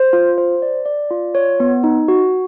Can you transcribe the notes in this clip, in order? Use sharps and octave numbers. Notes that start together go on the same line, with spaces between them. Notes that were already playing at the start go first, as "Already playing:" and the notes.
Already playing: C5
F4
C5
D5
D5
F4
C#5
B3
D#4
F#4